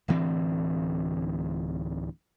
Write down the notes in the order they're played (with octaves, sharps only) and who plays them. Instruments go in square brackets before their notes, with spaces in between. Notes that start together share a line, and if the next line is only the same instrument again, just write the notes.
[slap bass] D1 D2 E3 C4